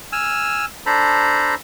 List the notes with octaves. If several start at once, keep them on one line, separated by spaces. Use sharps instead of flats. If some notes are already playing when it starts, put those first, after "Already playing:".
G#5 E6 F6
D4 A4 C5 A#5 B5